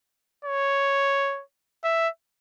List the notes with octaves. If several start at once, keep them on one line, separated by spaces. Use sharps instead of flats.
C#5
E5